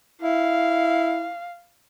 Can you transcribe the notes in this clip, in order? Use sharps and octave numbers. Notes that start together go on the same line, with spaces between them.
E4 F5